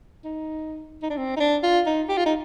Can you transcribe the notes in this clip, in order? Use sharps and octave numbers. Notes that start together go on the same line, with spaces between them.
D#4
D#4
D4
C4
D#4
D4
F4
D#4
G4
F4
D#4